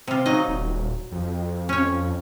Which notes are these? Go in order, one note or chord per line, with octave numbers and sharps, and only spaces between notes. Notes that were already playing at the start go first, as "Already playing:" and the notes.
C3 F4
F#3 D#4 D#5
D#1
F2
C#4 C#5